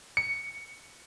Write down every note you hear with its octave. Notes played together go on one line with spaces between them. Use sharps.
C#7